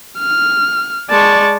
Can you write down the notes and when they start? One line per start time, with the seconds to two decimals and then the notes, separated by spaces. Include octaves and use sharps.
0.19 F6
1.10 G#3 D5 A5 C#6